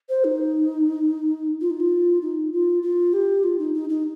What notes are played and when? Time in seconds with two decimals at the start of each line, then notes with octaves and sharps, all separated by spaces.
0.09 C5
0.24 D#4
1.61 F4
1.70 D#4
1.80 F4
2.22 D#4
2.53 F4
2.82 F4
3.13 G4
3.43 F4
3.59 D#4
3.74 D#4
3.89 D#4